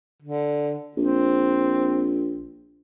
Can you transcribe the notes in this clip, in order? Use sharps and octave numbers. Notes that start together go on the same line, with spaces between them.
D3
A#1 C4